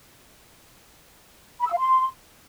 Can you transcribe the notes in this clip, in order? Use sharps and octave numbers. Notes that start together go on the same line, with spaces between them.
B5
E6
F5
C6